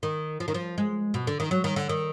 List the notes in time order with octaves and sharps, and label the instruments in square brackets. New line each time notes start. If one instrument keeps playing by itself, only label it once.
[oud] D#3
F3
D#3
F3
G#3
B2
D3
D#3
F#3
D#3
D3
D#3